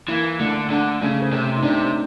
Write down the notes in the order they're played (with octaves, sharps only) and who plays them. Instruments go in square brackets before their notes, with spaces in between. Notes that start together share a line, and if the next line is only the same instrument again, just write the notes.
[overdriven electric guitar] E3 [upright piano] A#3
[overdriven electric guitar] D3 [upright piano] A3
[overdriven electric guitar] D3
[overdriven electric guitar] C#3 [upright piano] A3
[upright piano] C4
[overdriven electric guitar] C3 [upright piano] C#4
[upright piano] D#4
[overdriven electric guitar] C3 [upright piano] D4